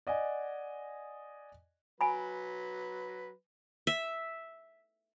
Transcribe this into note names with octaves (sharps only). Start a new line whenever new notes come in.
D5 D#5 F#5 G#5
F#3 B4 G#5 B5
E5